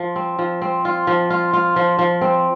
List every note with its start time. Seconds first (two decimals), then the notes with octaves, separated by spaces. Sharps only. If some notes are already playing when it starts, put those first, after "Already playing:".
Already playing: F3
0.16 C4
0.39 F3
0.62 C4
0.85 F4
1.07 F3
1.30 F4
1.53 F4
1.76 F3
1.99 F3
2.21 C4